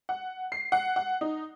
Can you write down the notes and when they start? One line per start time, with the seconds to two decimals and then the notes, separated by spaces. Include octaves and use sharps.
0.09 F#5
0.52 C7
0.72 F#5
0.96 F#5
1.21 D#4